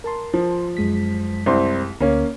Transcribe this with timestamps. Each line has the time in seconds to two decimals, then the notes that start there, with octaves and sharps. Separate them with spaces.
0.04 A#4 A5 C6
0.34 F3
0.77 F#2 G#3 B6
1.46 C2 C4 C6
2.01 D2 A#3 C#4